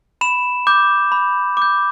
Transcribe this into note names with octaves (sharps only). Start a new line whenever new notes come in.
B5 E7
D6 G6
B5
D6 G6